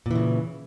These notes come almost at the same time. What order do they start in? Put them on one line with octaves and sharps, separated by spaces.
A#2 E3 C#3